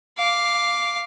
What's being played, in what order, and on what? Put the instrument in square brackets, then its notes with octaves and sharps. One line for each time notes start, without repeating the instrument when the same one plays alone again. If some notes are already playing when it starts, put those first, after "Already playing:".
[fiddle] F5 D6